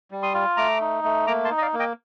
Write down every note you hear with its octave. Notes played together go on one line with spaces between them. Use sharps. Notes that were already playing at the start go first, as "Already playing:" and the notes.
G3
C6 D#6
F4
A3 A#5 D6
D#4
A3
A#3 A#5 D6
A5 C6
D#4
D#5
D5 F5
A#3
D#5 G5